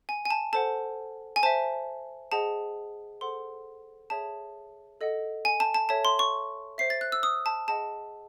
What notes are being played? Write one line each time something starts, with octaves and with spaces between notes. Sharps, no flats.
G#5
G#5
A5
A4 C5 F#5 A5
G#5
C5 E5 A5
G#4 C5 D#5 F#5 A5
A4 C5 F#5 C6
G#4 C#5 E5 A5
A4 D#5 F#5
G#5
A5
A5
A4 C#5 E5 A5
C6
C#6
C5 E5 C7
A6
F#6
E6
D#6
A5
G#4 D#5 F#5 A5